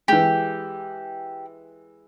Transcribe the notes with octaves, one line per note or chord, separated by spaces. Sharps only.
E3 G#3 G4